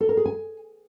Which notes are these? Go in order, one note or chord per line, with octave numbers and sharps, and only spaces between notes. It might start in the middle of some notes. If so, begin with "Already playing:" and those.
A4
A#4
G#4
G#5